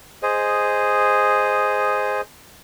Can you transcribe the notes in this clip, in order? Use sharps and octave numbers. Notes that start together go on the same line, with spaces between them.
G#4 C5 D#5